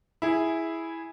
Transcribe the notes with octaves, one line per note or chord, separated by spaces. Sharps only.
E4 G#4